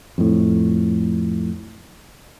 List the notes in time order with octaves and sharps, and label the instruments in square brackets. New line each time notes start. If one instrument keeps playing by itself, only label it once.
[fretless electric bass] F2 A2